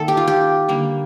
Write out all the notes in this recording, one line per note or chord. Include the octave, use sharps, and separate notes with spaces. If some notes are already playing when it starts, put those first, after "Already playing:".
Already playing: D#3 A#3 A4
G4
F4
G4
D3 G3 A#3